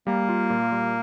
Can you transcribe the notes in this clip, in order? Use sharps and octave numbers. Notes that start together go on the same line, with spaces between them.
G3 A#3
F4
A#2
G3